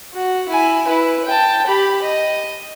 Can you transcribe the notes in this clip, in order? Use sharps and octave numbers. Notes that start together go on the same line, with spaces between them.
F#4
E4 G#5
E4 B4
G5 A5
G4 B5
D#5